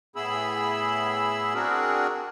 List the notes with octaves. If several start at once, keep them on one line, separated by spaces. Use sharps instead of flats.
A2 B3 E4 G#4 B5 E6
C4 D4 F#4 G#4 A#4